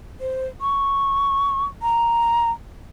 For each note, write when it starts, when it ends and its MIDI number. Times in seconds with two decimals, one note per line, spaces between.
0.20 0.47 72
0.61 1.65 85
1.82 2.50 82